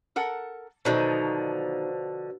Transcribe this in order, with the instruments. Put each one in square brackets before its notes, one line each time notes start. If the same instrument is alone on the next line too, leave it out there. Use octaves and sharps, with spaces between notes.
[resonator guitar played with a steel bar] A4 A#4 F#5
[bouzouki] B2 D3 F3 [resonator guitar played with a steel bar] D#3 F#3 D#4